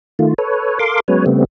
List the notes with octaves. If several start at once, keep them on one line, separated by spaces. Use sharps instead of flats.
D#3 A3 F4
A4 B4 C#5
A4 A#4 F5 C6 D6
F#3 G#3 B3 C#4 B4 C#5
C#3 G3 A3 B3 C4